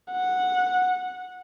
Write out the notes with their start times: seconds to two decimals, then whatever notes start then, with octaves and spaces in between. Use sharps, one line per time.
0.12 F#5